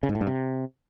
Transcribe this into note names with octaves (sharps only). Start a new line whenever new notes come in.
C#3
G#2
A2
G2
C3